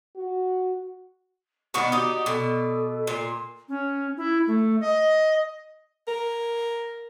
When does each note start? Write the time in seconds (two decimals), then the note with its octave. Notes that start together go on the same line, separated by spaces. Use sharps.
0.16 F#4
1.74 B2 D#3 B3 D5 F#5 C#6
1.92 D#4 F#4 G4
2.26 B2 A4
3.07 A#2 C6
3.69 C#4
4.17 E4
4.47 A3
4.81 D#5
6.08 A#4